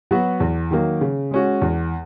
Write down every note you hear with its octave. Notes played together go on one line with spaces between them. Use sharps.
F#3 B3 F#4
E2
D#3 F#3 A#3
C#3
G#3 C#4 F#4
E2